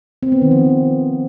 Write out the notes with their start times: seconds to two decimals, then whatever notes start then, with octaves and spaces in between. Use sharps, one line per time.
0.23 C4
0.32 B3
0.42 D#3
0.51 F3